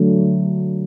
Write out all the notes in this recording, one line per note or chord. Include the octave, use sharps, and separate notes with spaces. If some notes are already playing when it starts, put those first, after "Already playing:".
Already playing: D3 F#3 A3